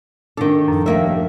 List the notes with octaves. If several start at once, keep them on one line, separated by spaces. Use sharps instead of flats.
A2 D#3 D4 A4
F#2 F3 D#4
D#2 A#3 E5